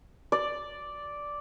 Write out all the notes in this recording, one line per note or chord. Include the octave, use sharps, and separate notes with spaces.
D5